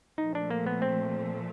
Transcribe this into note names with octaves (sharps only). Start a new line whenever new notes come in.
A#2 F3 A3 D#4
D4
A#3
B3
C4